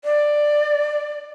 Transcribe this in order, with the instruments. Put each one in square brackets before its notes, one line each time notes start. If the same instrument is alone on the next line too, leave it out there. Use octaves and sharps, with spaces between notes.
[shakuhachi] D5